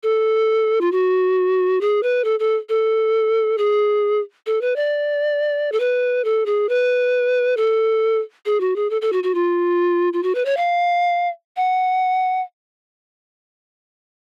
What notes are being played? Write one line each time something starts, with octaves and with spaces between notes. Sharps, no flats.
A4
F4
F#4
G#4
B4
A4
A4
A4
G#4
A4
B4
D5
A4
B4
A4
G#4
B4
A4
G#4
F#4
G#4
A4
A4
F#4
F#4
F4
F4
F#4
B4
C#5
F5
F#5